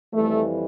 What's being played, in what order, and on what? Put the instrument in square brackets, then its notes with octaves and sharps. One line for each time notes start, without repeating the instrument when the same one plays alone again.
[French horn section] F2 E3 G3 A3